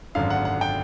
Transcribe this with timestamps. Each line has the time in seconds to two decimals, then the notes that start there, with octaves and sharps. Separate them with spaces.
0.15 G#1 F#2 D3 F5
0.30 F#5
0.45 F#5
0.61 G5